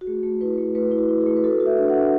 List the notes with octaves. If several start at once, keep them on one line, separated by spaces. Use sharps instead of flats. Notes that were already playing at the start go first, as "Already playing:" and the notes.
F#4
A3 G#4
A3
E4 B4
A3
A3 B4
E4
F#4
E4
G#4
A3
B4
F#4 A4
F#4
E5
D4
D4 F#5